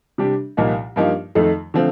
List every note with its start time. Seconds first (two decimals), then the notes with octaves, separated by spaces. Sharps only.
0.18 C3 G3 D4 G4
0.57 C2 A#2 F3 A#3 D#4
0.96 G2 F3 A#3 D#4 G4
1.35 F2 D#3 A3 D#4 A4
1.74 D3 F3 A3 C4